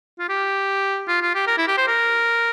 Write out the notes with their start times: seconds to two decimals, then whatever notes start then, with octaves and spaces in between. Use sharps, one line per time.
0.19 F4
0.29 G4
1.08 F4
1.22 F4
1.34 G4
1.47 A#4
1.58 E4
1.68 G4
1.77 C5
1.87 A#4